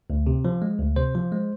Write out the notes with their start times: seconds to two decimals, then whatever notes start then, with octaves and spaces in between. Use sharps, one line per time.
0.10 D2
0.27 C3
0.45 F3
0.62 G#3
0.79 D2
0.96 C3 C5
1.15 F3
1.32 G#3